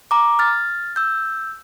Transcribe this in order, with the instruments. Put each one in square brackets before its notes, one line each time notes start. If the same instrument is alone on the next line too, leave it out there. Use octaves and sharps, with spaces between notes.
[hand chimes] A#5 D6
F6 A6
E6 G6